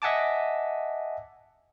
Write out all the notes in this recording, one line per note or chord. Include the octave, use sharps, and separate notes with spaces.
D#5 E5 F#5 G#5 A5 D6